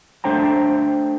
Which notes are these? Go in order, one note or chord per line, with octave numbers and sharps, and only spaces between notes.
A3 D4 C5 G5 A#5